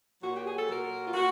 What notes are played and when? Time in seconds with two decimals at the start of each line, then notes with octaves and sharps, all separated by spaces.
0.21 A#2 F#3 F#4
0.34 G4
0.45 G#4
0.56 A4
0.68 A#2 F#3 A#4
1.05 F4
1.13 A#2 F#4